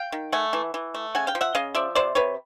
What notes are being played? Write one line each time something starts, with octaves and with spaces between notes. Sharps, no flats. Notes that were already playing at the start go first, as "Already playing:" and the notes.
Already playing: F5 G5
D#3
A3 F#5 G#5
E3
E3
A3
C#3 F#5 G#5
F5 G5
F3
E5 F#5
C#3 D#5 F5
F3 D5 E5
C3 C5 D5
C3 B4 C#5